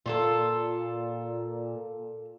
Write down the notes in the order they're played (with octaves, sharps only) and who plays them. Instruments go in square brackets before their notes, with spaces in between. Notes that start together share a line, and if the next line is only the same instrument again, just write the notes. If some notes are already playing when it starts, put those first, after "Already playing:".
[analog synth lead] A#2 [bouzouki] F4 F#4 A4